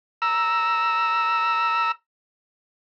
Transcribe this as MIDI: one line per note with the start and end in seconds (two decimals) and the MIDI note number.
0.22 1.92 82
0.22 1.92 88